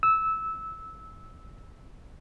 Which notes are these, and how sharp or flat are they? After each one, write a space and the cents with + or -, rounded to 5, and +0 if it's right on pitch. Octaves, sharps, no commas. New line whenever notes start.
E6 -15